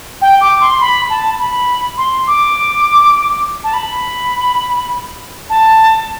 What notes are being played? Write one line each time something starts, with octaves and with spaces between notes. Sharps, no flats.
G5
D6
C6
B5
A5
B5
C6
D6
A5
B5
A5